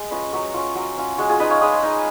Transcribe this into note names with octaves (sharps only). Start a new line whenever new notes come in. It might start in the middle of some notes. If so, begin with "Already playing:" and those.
Already playing: G#3
C#4 F4 B4 D#5
F#3 A#4 C#5
C#4 F4
F#3
C#4 F4
G#3 F#4
F4 G#4
D#4 B4 D#5
C#5 F5
G#3 B5 D#6
D#4